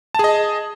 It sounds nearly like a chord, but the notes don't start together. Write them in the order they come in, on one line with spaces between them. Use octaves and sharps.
A5 G#4 D#5